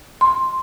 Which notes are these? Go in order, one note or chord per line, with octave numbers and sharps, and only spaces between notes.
C6